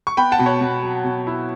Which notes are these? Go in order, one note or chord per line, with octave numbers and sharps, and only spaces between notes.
C#6
B3 G5 B5
F#5 A5
B2
C#5
B2
F#3
B2
E4